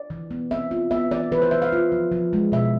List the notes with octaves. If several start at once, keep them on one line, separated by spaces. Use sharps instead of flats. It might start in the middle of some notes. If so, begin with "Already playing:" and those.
Already playing: D5
E3
B3
C4 E5
F4
B3 E5
E3 D5
E3 B4
C5
E3 E5
F5
F4
F3
F3
G#3
B2 E5